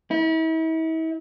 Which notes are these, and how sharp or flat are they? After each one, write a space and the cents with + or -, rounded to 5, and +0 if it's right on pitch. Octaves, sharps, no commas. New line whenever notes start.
E4 -40